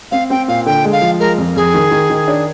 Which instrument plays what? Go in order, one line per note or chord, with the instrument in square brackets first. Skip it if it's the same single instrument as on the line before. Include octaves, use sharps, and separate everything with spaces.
[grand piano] C4 [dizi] F5
[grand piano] C4 [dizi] G5
[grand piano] A#2 [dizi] F5
[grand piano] D3 [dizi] G5
[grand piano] G#3
[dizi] F5
[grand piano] F3
[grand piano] G#3 [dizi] A#4
[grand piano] F2
[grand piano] F2 [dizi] G#4
[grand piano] D#3
D#3
D#3
D4